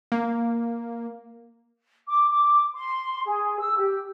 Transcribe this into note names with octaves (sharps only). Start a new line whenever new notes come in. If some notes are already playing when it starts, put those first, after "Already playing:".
A#3
D6
D6
C6
G#4
E6
G4